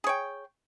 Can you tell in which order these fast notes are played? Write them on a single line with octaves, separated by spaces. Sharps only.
G#4 C#5 G5